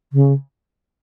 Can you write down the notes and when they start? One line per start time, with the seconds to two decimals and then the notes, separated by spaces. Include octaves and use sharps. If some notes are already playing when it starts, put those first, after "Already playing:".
0.13 C#3